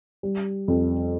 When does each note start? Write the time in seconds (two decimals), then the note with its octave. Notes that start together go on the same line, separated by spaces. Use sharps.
0.23 G3
0.68 F2